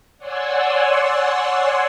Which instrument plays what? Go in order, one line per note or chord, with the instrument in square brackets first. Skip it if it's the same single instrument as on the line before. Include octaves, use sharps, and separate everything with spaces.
[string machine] C#5 D5 F#5 G#5 C6 E6